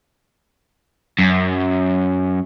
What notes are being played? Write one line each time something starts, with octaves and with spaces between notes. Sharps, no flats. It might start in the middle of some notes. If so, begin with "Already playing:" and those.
F#2